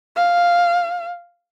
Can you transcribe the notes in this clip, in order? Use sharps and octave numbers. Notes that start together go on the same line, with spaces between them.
F5